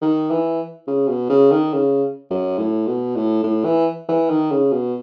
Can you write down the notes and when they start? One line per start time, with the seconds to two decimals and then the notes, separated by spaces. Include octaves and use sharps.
0.02 D#3
0.30 E3
0.87 C#3
1.08 B2
1.30 C#3
1.51 D#3
1.73 C#3
2.30 F#2
2.58 A2
2.87 B2
3.15 A2
3.43 A2
3.65 E3
4.09 E3
4.30 D#3
4.51 C#3
4.72 B2